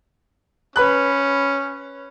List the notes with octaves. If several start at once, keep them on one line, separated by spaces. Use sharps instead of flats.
C#4 B4 B5 F#6